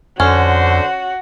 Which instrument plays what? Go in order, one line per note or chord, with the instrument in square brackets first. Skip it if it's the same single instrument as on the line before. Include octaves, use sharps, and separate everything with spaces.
[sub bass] F2 [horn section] D3 C5 [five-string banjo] C#4 [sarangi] F#4